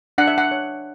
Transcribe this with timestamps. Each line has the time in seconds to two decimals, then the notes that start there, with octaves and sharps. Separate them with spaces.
0.18 D4 F#5
0.27 E5
0.38 F#5
0.51 C#5